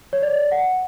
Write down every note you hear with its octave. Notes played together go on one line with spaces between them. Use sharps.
C#5
D5
F#5